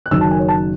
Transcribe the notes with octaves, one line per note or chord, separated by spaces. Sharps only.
F#6
F#1 F#2 D#3 F#3 E6
A5
G#5
C#5
A5